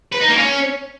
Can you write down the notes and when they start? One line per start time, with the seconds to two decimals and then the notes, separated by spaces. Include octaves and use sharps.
0.12 B4
0.20 D#4
0.29 A#3
0.37 C#4